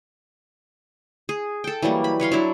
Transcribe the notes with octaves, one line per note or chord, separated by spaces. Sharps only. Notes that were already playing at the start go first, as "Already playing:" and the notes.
G#4
A4 G5
E3 F#3 G3 A#3
B5
B4 C#5 F5 C6
F#3 D4 E4